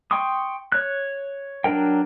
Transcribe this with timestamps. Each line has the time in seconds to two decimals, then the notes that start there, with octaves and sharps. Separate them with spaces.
0.11 G5 C6 C#6 D#6
0.72 C#5 F#6
1.64 F#3 D4 A#4 G5